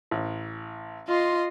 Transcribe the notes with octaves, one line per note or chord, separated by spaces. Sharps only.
A1
F4 D#5 C6